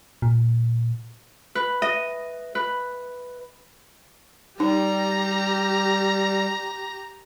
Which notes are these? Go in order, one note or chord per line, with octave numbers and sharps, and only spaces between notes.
A#2
B4
D#5
B4
G3 D#4 G4 A#5